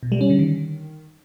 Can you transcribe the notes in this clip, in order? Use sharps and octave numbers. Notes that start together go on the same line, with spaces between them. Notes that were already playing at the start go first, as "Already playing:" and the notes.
B2
G3
C#4
D3
D#3